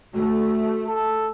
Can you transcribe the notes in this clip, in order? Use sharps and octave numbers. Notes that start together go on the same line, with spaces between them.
A3 F#4
A4